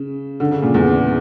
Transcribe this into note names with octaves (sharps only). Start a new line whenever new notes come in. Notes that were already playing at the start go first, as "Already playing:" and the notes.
Already playing: C#3
D3
C#3
A#2
E2